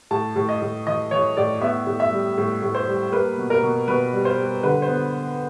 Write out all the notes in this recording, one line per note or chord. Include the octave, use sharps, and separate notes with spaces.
A2 A5
A2
D#5
A2
E3 D#5
E3 C#5
A2 D5
B3 E5
A2
E5
G3
A2
A2
C5
G3
A#3 B4
B2
A#4
B2
B2 B4
G3
C5
G3
D3 B4
C5
B3